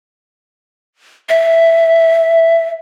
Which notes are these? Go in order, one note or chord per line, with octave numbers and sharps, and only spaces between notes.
E5